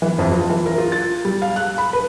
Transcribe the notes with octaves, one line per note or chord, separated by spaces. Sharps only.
E3
F2
F4
E3
A#4
F4
A6
G3
F5
F#6
B5
B4